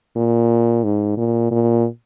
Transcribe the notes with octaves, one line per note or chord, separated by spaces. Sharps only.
A#2
G#2
A#2
A#2